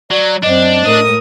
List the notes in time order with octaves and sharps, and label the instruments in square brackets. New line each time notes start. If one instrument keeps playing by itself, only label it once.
[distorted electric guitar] F#3 [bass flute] D5
[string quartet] F#2 C4 [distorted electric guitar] D4 [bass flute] D#5
[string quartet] A2 A#4 D#6